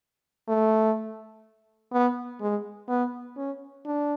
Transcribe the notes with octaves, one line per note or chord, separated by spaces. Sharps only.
A3
B3
G#3
B3
C#4
D4